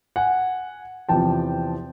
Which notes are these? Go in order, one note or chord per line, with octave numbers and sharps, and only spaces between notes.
F#5 G#5
E2 C3 F3 G5 A5